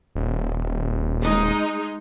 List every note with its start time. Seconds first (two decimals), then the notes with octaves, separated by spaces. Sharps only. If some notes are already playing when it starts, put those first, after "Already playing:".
0.15 D#1
1.22 G#3 D#4